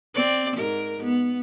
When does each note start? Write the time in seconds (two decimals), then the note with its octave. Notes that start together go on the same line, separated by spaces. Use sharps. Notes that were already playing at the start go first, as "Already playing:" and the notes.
0.14 C4 D5
0.57 G#2 A#4
1.03 B3